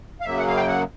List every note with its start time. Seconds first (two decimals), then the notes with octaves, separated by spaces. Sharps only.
0.21 F5
0.25 F#2 C#3 F#3 A#3 E5
0.38 F#5
0.47 F5
0.57 G5
0.68 F#5